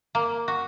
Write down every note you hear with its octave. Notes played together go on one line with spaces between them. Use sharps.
A#3
F#4